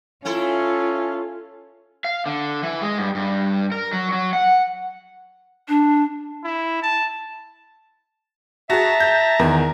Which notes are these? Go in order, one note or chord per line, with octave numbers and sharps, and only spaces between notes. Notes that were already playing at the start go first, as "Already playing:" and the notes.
A3 C#4 E4 F4 A4
F5
D3
E3
G#3
G2
G2
A#4
F#3
F#3
F#5
D4
E4
A5
F#4 G#4 E5 A5 A#5
G6
E2 D#3 A#4